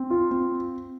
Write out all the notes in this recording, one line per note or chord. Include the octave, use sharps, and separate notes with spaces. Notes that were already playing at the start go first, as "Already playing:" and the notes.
Already playing: C4
F4
C4